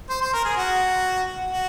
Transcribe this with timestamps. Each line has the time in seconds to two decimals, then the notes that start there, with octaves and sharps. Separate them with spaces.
0.09 C5
0.21 C5
0.33 A#4
0.45 G#4
0.57 F#4
1.50 F#4